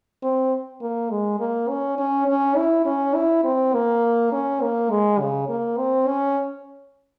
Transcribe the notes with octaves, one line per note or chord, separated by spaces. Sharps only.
C4
A#3
G#3
A#3
C#4
C#4
C#4
E4
C#4
E4
C4
A#3
C#4
A#3
G#3
C#3
A#3
C4
C#4